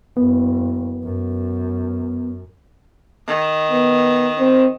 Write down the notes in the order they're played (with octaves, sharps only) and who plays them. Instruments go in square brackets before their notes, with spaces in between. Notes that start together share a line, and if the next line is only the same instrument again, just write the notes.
[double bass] F#1 [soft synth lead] B3
[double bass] F#2
[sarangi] D#3
[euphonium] B3
C4